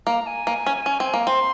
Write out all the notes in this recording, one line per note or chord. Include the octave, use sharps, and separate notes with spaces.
A#3 A#5
G#5
A#3
C#4
C#4
C4
A#3
C4 C6